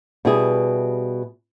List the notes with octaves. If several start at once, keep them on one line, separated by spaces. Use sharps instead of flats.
B2 G3 E4 G#4